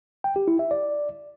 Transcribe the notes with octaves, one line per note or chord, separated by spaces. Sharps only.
G5
G4
E4
E5
D5